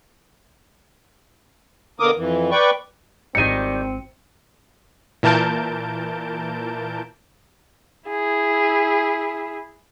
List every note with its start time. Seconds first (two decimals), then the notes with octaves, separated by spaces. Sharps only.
2.00 B2 D3 A#3 A#4 D6 D#6
2.16 F2 E3
2.51 B4 D5 G5 C#6
3.35 G#1 D#3 G3 C4 D#4 F4 C#7 D#7
5.23 A#2 E3 A#4 A5 G6 D7
8.09 E4 G#4